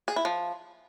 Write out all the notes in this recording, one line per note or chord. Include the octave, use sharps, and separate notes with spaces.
G#4
E4
F3